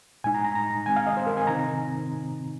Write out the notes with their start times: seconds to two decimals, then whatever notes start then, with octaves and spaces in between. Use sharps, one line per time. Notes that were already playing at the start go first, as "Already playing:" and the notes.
0.24 A#2 G#3 D#4 G#5
0.34 A#5
0.45 A#5
0.55 A#5
0.86 D#3 G#3 C4 G#5
0.96 F5
1.07 D#5
1.17 C5
1.27 A#4
1.37 G#5
1.47 C3 D#3 C4 D#4 A#5